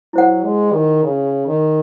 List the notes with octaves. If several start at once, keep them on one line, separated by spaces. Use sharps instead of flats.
F#3 E4 C5 F#5
G#3
D#3
C#3
D#3